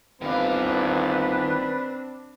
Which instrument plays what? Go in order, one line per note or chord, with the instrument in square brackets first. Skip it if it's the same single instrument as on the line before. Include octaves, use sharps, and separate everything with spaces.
[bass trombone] G1 [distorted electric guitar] D#3 F5 [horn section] C4 D4 [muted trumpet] B4